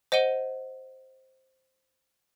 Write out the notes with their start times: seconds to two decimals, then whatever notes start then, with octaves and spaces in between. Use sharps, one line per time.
0.12 C5 D#5 F#5 D#7 G7